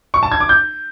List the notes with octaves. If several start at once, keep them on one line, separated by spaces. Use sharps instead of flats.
C#6
A5
G#6
D6
G6